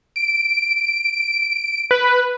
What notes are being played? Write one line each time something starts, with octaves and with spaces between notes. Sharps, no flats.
D7
B4